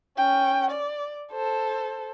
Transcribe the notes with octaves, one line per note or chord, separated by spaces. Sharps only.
C#4 G5
D5
A4 C5